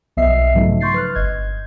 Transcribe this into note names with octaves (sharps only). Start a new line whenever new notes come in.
B1 F3 B3 D#5 E5 C7
G#2 C#3 F3 F#3 A3 D#4
C6 C#6 G6 A6 C7
B4 F6 F#6
G1 D#5 G6 G#6